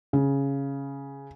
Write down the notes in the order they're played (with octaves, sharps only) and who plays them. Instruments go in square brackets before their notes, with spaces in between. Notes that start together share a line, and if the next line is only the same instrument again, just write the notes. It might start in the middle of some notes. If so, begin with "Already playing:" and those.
[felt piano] C#3